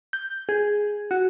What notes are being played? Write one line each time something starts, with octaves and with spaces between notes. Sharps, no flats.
G6
G#4
F#4